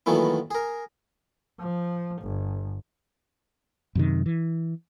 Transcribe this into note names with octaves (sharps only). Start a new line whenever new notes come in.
A#2 D#3 E3 F#3 A3 B3
G#4 A#4
F3
G1
F#2 C3 D#3
E3